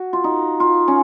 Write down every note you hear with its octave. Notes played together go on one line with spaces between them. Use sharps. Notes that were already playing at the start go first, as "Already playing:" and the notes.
Already playing: F#4
F4
D#4
F4
C#4